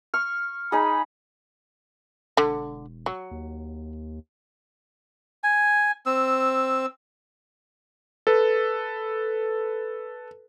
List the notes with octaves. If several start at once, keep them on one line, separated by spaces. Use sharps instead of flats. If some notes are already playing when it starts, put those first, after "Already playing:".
C#6 F6
D#4 G#4 B5
E1 D3
F#3
D#2
G#5
C4 E6
A4 B4